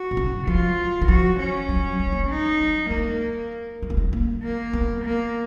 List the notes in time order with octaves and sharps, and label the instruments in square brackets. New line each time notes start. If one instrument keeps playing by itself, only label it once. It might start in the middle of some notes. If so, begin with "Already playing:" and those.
Already playing: [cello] F#4
[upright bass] B2
C#3
[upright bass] F3 [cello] F4
[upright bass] D#3
[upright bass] F3 [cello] F#4
[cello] C#4
[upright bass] F#3
G#3
A#3
G#3
[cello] D#4
[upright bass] F#3
[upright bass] G#3 [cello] A#3
[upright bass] G#3
A#3
G#3
A#3
[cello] A#3
[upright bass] B3
[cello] A#3